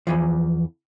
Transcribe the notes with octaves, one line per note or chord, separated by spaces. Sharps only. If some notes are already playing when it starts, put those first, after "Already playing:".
E2 E3 F3